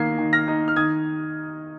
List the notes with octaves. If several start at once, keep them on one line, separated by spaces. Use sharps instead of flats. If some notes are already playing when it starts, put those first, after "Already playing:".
Already playing: D#3 A#3 D#4 G#6 C7
D#3
F6 A#6
D#4
F6
D#3 D#6 G#6